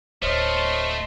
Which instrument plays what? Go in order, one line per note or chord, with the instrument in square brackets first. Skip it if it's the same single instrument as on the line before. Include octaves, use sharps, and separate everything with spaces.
[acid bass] D1 [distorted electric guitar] A3 [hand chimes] C5 C#5 F6 [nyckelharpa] D#5 C6